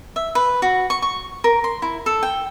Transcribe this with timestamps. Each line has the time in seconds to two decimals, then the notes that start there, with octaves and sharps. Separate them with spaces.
0.16 E5
0.35 B4
0.62 F#4
0.90 C#6
1.02 C#6
1.44 A#4
1.64 C6
1.82 E4
2.06 A4
2.23 G5